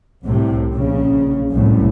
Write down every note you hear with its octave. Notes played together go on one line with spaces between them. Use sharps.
C2 A2 C3
A#1 C#3
C2 F#2 A2